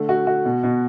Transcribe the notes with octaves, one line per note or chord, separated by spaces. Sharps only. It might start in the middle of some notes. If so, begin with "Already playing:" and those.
Already playing: D3 A3
F#4
F#4
B2
B2